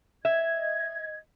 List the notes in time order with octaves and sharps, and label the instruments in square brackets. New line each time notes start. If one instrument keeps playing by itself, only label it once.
[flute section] D#5 G#6 [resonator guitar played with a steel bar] E5